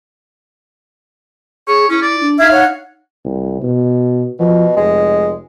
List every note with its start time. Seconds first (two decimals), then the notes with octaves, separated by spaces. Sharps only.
1.67 G#4 C#5
1.90 C#4 E4
2.02 D5
2.21 D4
2.39 D#4 E5 F5 G#6
2.52 C#5 F#5
3.25 C2
3.62 B2
4.40 B2 F3
4.77 F1 G#3